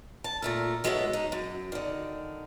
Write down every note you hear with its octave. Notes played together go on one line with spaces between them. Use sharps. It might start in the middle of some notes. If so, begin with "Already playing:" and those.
A5
A#2 A3 A#4
F#3 G#3 B3 A4 C#5 E5
D#4
F#2
D3 D#3